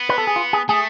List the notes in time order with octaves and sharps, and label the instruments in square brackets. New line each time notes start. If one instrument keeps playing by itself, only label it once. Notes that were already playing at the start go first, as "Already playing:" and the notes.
Already playing: [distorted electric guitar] B3
[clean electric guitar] B4
A4
G#4
F4
G#4
[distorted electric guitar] A3 [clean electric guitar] G#4